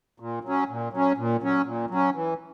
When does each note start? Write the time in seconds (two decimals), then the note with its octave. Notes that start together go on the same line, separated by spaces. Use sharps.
0.20 A#2
0.44 F#3 C#4
0.69 A#2
0.93 F#3 C#4
1.17 A#2
1.42 F#3 C#4
1.66 A#2
1.90 F#3 C#4
2.15 E3